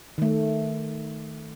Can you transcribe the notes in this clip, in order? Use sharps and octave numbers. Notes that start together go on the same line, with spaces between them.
D#3 A3